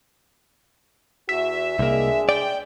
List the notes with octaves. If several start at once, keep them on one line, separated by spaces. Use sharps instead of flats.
E2 F#4 E5
C2 G#3 A#3 D4 G#4
D5 G5